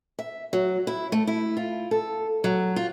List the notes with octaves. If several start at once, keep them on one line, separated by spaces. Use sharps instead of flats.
E5
F#3
E4
A3
E4
F4
A4
F#3
F4